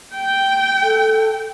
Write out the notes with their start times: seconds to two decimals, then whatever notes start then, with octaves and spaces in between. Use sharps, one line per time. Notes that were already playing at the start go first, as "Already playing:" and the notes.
0.14 G5
0.83 A4